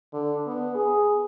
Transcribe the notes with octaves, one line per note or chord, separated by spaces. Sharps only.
D3
B3
G#4